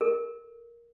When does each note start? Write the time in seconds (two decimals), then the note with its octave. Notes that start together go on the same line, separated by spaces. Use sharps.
0.01 A4 A#4